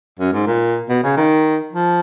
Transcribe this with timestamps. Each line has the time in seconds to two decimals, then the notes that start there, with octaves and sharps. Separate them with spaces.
0.19 F#2
0.33 G#2
0.47 A#2
0.89 B2
1.03 C#3
1.17 D#3
1.73 F3